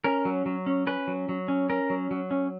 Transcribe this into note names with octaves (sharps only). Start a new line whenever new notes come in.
C#4 A#4
F#3
F#3
C#4
C#4 B4
F#3
F#3
C#4
C#4 A#4
F#3
F#3
C#4